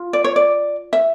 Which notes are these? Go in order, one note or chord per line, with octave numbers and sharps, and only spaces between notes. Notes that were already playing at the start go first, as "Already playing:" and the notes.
Already playing: F4
D5
C#5
D5
E5